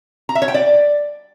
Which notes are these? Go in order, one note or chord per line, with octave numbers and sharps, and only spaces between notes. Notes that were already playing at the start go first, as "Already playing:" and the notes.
A#5
E5
C#5
G5
D5